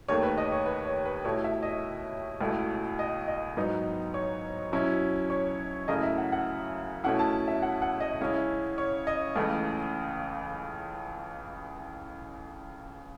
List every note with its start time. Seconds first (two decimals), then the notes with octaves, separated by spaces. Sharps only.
0.08 D#2 D#3 A3 C#5
0.23 B4
0.38 D#5
0.52 C#5
0.66 B4
0.85 C#5
1.05 B4
1.24 B2 A3 E4 C#5
1.44 E5
1.63 D#5
2.41 C#2 B2 A3 E4
2.99 D#5
3.28 D#5
3.57 G#2 F#3 B3 D#4
4.14 C#5
4.72 B2 F#3 C#4 E4
5.30 C#5
5.88 F#2 C#3 F#3 A3 E4 D#5
6.03 E5
6.18 F#5
6.32 F#5
7.04 B2 A3 C#4 E4 F#5
7.19 A5
7.48 E5
7.62 F#5
7.82 F#5
8.00 D#5
8.20 C#3 G#3 C#4 E4
8.78 C#5
9.07 D#5
9.36 C#2 C#3 E3 A3